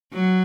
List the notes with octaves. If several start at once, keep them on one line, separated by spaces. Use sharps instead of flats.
F#3